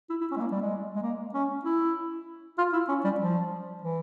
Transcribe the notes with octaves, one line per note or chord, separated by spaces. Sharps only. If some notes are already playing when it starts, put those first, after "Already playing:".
E4
E4
C#4
G#3
A#3
G3
G#3
G#3
A#3
C#4
E4
F4
E4
C#4
G3
F3
E3